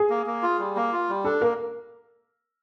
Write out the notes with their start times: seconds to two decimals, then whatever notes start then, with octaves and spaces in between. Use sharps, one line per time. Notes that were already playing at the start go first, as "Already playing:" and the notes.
Already playing: G#4
0.10 A#3
0.26 A#3
0.43 F4
0.59 G3
0.76 A#3
0.93 F4
1.09 G3
1.24 D4 A4
1.41 A#3 A#4